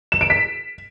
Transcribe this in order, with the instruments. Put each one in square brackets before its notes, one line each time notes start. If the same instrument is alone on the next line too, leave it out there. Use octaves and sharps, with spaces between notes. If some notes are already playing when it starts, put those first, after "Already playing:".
[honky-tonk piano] E7
D7
B6